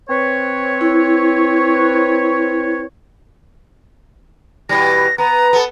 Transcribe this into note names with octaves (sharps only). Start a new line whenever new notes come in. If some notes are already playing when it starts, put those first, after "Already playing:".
C4 B4 C#5
E4
B2 E3 G3 A#6
B3 A#5
B3 A4